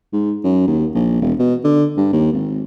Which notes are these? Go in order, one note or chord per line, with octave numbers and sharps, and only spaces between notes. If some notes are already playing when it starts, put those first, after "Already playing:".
G#2
F#2
D#2
A#1
E1
B2
D3
G2
D#2
G#1